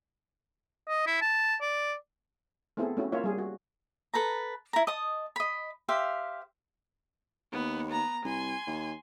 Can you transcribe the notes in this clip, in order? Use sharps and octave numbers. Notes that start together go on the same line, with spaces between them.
D#5
E4
A5
D5
A3 B3 C4 E4 G#4 A4
A3 C#4 E4 F#4
A#3 E4 F4 C#5 E5
G3 G#4
F#4
A4 B4 A5 A#5
E4 A#5
D#5 A5 D#6
D#5 B5
G4 C5 E5 F5
D#2 B3
B3 A#5
C2 G#5 C6
D#2